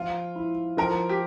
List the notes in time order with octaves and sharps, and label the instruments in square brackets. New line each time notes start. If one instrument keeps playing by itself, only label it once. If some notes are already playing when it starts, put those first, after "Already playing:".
Already playing: [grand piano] F3 [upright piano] F4
[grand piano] E4
[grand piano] F3 [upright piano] A#4
[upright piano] G4